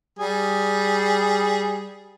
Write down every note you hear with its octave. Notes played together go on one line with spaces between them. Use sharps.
G3 G#4